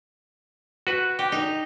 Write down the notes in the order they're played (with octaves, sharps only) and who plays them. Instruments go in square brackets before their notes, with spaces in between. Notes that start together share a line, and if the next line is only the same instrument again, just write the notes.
[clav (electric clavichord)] F#4 B4
[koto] G4
D#4